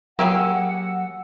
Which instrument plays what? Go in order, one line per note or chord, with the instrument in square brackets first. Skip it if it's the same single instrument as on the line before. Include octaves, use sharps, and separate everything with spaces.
[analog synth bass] F#3 [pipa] A#3 G4 G#4 [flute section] F#5 [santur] E6